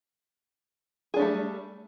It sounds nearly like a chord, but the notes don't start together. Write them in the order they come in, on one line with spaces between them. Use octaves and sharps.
G#4 D4 C#4 A3 G3